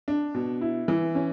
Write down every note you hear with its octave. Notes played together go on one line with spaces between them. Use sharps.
D4
B2
E4
E3
C#4